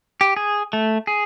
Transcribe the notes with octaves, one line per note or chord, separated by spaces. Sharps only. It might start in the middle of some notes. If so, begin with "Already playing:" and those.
G4
G#4
A3
G#4